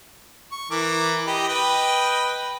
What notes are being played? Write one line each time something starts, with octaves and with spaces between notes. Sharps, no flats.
C#6
E3 A#4 D6
G4 D#5 B5
B4 D#5 G5